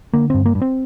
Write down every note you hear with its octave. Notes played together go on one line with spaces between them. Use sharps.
D3 A#3
G2 C4
A#3
G2
C4